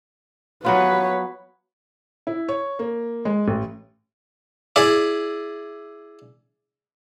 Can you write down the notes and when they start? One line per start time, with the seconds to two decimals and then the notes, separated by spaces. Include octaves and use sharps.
0.65 F#3 B3 F4 B4 C#5
2.27 E4
2.49 C#5
2.79 A#3
3.25 G#3
3.48 A1
4.76 E4 G#4 D5